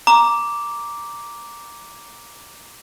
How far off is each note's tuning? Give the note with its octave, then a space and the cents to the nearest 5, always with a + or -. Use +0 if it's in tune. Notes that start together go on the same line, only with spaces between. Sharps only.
A#5 +5 D6 -5